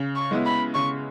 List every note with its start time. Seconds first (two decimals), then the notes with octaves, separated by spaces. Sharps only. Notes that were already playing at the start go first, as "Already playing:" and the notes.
Already playing: C#3
0.15 C#6
0.31 G#3 B3 E4
0.46 B5
0.74 C#3 C#6